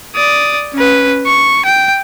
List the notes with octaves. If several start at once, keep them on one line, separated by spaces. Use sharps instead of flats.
D5 D#6
C#4 B4
C#6
G5